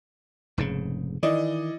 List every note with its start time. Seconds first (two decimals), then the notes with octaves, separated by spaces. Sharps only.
0.58 F1 G#2 C#3
1.23 D#3 E3 D5 D#5